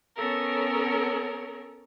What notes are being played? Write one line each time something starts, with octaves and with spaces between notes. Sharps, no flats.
B3 C#4 A4 A#4 C#5